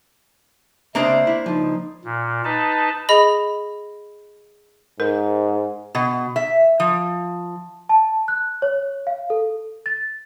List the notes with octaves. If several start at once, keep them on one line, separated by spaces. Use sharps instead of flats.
C#2 C3 A#3 D4 C5 D#5 E5
E4
C#2 F3 D#4
A#2
D#4 B4 A5
G#4 D#5 B5
G#2 A#4
B2
E5
F3
A5
F#6
C#5
F5
A4
A6